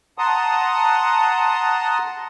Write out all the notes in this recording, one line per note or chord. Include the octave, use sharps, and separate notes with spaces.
F#5 A5 A#5 C6 D#6